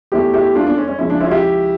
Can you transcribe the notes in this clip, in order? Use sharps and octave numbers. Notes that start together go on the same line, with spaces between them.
E2 E3 A3 E4 G4
E4 G4
D4 F4
D4
C#4
C#4
C#2 C#3 F3 C#4 E4
D4
C#4 E4
F4
E4 G4